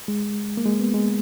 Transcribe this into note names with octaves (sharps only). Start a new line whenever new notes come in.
G#3
A#3
G#3
B3
G#3